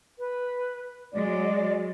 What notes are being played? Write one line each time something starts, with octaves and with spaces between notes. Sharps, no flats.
B4
F#3 G#3 D5